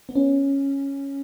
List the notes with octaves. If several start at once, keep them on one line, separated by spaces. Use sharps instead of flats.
B3
C#4